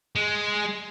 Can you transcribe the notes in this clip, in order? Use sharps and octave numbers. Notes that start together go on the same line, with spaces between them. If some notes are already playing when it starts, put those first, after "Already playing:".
G#3